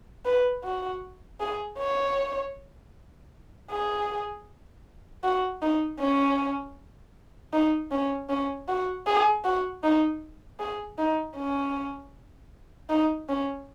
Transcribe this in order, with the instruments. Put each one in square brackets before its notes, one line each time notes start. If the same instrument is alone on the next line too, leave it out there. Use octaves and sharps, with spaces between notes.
[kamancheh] B4
F#4
G#4
C#5
G#4
F#4
D#4
C#4
D#4
C#4
C#4
F#4
G#4
F#4
D#4
G#4
D#4
C#4
D#4
C#4